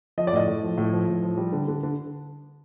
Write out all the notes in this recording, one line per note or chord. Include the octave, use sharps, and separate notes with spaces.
F3 D#5
D5
A2 D#5
A2
F3
A2
F3
A2
F3
G3
D3
D3
D3